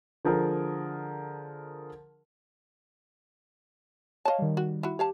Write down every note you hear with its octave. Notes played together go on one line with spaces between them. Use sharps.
D3 F3 G#4 A#4
C#5 D#5 F5 A5
D#3 G3
F#4
E4 F#4
G4 C#5 F5 A5